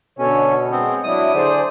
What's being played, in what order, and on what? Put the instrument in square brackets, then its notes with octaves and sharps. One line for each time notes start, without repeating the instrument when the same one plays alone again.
[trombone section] B2 [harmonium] D3 A4 C#5 [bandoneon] C#4
[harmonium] G#3 [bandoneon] B3 C4
[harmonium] F#3 D4 E4 [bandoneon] D#6
[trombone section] D3 C5 [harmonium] G#4 D5